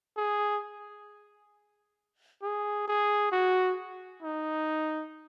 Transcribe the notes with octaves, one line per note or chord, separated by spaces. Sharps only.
G#4
G#4
G#4
F#4
D#4